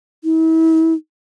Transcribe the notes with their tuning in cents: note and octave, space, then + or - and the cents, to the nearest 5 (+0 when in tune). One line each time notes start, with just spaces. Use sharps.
E4 -40